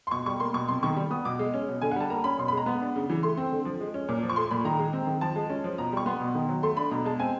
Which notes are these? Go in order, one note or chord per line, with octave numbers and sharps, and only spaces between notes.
C6
B2 C#6
G3 C#6
A#3 C6
B2 C#6
C3 C6
D#3 C#6
G3
B3 D#6
B2 D6
G#3
C#4
B2
D3 G#5
F#5
G3 A5
A#3 A#5
C#4 B5
B2 C6
B5
G#3 A#5
B3 B5
D4
C#3
E3
A3 C6
C4
D3
F3
G#3
C#4
A#2
F3
C#6
A3 C6
A#2 B5
D#3 A#5
G#3
C4
D#3
F3 A5
G#3
C#4
F3
B2 A#5
G3 C#6
B3 C6
B2
D#3
F#3
A3 C6
D4 B5
B2 A#5
G#3 A5
C4 G#5